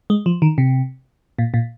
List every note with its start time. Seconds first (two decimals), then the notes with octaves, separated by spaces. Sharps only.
0.10 G#3
0.26 F3
0.42 D#3
0.58 C3
1.39 A#2
1.54 A#2